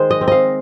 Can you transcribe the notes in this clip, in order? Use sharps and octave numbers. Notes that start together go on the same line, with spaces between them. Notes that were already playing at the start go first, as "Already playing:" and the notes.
Already playing: D#3 G#3 C5
D#5
C4
D#5 F5